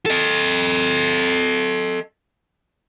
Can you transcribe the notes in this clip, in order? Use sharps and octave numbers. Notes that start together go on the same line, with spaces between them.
A4 D#5